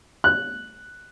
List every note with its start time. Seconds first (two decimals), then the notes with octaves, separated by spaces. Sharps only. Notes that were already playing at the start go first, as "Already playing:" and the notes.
0.24 F#6